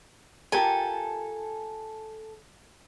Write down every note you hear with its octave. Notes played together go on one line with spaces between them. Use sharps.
F4 G4 A4 A#4 G#5